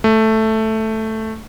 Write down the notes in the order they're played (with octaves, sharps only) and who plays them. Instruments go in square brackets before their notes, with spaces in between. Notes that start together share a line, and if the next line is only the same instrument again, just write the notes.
[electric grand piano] A3